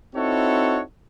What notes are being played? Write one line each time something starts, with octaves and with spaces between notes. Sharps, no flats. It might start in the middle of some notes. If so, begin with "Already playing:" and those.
C4 D#4 E4 F#4 A4 C#5